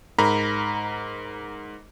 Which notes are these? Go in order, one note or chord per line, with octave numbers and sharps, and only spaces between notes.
G#2 A#4 A#5 B5